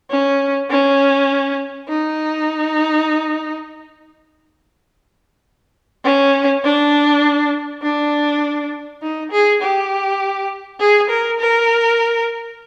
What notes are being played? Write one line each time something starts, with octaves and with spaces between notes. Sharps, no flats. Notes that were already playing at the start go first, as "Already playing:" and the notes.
C#4
C#4
D#4
C#4
D4
D4
D#4
G#4
G4
G#4
A#4
A#4